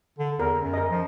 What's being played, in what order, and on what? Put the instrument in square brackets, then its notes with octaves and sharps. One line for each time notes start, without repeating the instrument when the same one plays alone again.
[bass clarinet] D3
[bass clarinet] E2 [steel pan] A#4
[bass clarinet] F#2
[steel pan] A#4 D#5
[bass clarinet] F3